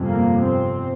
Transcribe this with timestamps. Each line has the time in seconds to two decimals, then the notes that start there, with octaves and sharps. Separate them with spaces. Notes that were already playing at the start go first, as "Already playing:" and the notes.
Already playing: G1 F2 C3
0.09 A#3
0.44 C4